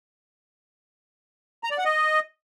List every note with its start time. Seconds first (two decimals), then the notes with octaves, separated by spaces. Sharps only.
1.64 A#5
1.71 D5
1.78 F#5
1.85 D#5